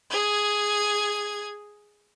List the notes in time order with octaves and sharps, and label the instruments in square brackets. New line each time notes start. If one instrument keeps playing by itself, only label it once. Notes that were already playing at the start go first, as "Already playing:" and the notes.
[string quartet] G#4 G#6